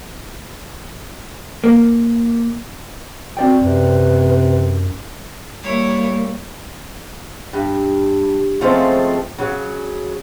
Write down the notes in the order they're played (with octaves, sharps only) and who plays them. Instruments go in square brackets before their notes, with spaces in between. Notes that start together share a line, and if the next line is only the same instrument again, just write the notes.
[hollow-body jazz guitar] A#3
[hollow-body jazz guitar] C4 D5 G5 [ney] F#4
[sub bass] F#2 [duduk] C3 [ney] B4
[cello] G3 A#3 [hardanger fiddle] E4 C#5
[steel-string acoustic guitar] G2
C#3 F3 G#3 A3 C4
C#3 F#3